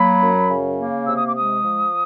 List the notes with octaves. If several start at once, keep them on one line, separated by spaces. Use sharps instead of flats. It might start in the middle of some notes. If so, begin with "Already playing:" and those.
Already playing: F#3 A#3 B5
F#2
C#3
A#3
C3 E6
D#6
D6
G#3 D#6
F3